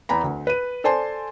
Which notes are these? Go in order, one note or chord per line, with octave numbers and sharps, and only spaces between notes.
E2 G#5 A#5 B5
D2
B4 D#7
A4 C5 D5 G#5 A5 C6